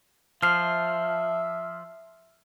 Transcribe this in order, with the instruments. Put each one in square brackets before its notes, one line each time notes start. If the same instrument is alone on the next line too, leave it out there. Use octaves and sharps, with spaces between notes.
[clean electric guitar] F3 [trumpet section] E5 [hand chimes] F6 C7